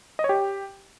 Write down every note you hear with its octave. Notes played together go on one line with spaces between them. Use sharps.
D#5
C#5
G4